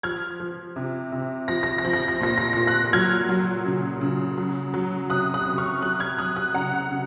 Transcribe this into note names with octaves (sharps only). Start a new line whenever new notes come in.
F3 F6 G#6
F3
C3
C3
F3 A#6
A#6
A#6
F3
A#6
A#6
A#2 A#6
A#6
A#6
A#2
F#6 A#6
F#3 F6 G#6
F#3
C#3
C#3
F#3
F#3
C3 D#6 F#6
D#6 F#6
C3
C#6 F6
F#3 D#6 F#6
F6 G#6
F#3 D#6 F#6
D#6 F#6
C#3 F#5 A#5
C#3